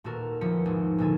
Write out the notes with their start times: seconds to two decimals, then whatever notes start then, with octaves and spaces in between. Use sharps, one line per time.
0.04 D#1 A#2 A3 F#4 A4 A#4
0.41 D#1 E2 D#3 F3 B6 C#7
0.66 G#1
0.98 A#1 A#2 D3 A4 G#5